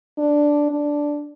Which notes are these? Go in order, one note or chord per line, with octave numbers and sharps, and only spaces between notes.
D4
D4